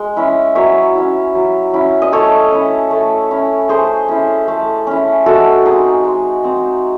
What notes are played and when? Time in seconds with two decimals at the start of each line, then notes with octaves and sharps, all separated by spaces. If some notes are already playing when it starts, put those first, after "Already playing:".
Already playing: G#3
0.17 C#4 E4
0.55 F#3 C#5 E5
0.95 C#4 E4
1.35 F#3
1.73 C#4 E4
2.02 D#5
2.12 A3 A4 C#5
2.52 C#4 E4
2.91 A3
3.31 C#4 E4
3.69 A3 G#4 C5
4.08 C#4 E4
4.48 A3
4.87 C#4 E4
5.26 G#3 F#4 A4
5.65 C4 D#4 G#4
6.04 G#3
6.44 C4 D#4